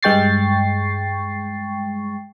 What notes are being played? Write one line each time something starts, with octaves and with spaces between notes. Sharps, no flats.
G2 G#3 G5 C#6 A6 C7